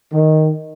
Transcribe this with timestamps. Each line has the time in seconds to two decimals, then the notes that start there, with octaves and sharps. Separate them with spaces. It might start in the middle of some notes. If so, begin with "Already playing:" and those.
0.12 D#3